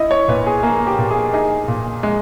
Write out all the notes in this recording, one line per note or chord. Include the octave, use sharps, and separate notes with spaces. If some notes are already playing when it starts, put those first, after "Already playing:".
Already playing: E4 D#5
C#5
A#2 B4
G#4
A#3 G#4
G4
A#2
G#4
D#4 G#4
A#2
G#3